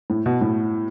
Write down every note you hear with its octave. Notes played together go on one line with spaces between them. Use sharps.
A2
B2
A2